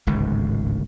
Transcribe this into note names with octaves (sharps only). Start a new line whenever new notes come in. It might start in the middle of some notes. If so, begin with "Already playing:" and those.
D1 G#1 C#2 G#2